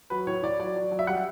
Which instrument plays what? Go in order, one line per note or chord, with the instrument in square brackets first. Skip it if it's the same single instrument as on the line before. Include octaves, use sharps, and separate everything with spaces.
[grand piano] F#3 B4
A2 C#5
A2 D5
F#3 D5
F#3
F#3
E5
G3 F#5